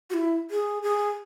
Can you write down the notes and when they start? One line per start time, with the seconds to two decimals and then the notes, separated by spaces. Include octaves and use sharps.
0.10 F#4
0.14 E4
0.51 G#4
0.83 G#4